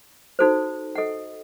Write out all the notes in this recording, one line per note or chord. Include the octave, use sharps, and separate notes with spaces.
D#4 F#4 A4 C5
A4 D#5 F#5